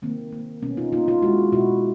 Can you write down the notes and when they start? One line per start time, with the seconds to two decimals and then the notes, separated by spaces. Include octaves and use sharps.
0.02 D#3 A#3 C4
0.32 A#3
0.63 B2 B3 C#4
0.77 D#4 F4
0.92 A#3 D#4 F4
1.08 D#4 F4
1.22 G#3 E4 F#4
1.52 B2 E4 F#4